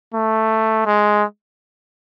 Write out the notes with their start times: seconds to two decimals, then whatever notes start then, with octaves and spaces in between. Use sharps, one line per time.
0.14 A3
0.86 G#3